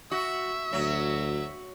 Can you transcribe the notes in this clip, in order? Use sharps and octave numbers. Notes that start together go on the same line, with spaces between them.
F#4 E5
D2 F#3